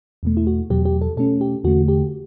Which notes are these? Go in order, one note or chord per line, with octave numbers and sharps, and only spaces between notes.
E2 B2 A3
E4
F#4
E2 B2 F#3 G4
G4
A4
B2 A3 C#4 A4
G4
E2 D3 A3 F#4
G4